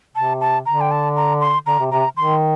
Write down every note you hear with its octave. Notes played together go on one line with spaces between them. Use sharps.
C3 A5
A5
D3 A#5
G5
A5
A#5
C6
D3 A#5
C3
C3 A#5
D#3 C6